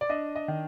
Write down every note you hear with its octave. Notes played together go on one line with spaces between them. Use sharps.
D5
D4 D#5
D#5
D#3